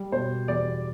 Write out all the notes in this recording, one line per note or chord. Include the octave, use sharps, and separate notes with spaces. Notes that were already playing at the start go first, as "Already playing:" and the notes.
Already playing: G3
B2 C5
E2 D5